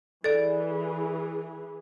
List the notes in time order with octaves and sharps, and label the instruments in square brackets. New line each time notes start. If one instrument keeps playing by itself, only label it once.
[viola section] E3 G#4 [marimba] A4 D5